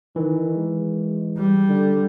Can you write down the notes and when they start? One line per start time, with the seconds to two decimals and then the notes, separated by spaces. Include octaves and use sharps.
0.16 D#3 E3
0.56 G#3
1.37 G3
1.69 D3